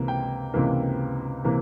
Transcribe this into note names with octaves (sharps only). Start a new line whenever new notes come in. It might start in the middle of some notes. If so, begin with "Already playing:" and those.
Already playing: C#2 C3 E3 A#3
G5
C#2 C3 E3 A#3
C3 E3 A#3